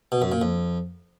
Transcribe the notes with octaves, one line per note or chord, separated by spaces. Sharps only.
B2
F#2
A#2
F2